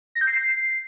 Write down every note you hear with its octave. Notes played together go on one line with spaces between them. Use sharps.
A#6
G6
C7